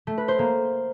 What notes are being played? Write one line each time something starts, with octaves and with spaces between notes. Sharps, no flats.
A3
B4
C5
A#3